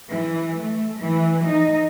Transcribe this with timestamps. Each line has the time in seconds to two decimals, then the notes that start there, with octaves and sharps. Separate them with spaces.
0.10 E3
0.59 A3
1.03 E3
1.46 D#4